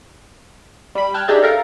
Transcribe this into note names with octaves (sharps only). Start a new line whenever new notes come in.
G3 B5
G5 A5 F6 F#6 G#6
D4 D#4 G4 G#4 D5 E5
A4 A#4 F5 A#5